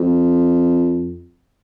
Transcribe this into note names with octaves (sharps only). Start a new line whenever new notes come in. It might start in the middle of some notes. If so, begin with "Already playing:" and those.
Already playing: F2